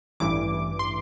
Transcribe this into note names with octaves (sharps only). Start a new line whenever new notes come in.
A1 G2 E3 D6
C6